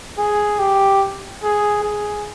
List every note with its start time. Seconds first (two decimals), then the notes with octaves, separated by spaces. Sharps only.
0.18 G#4
0.59 G4
1.43 G#4
1.84 G#4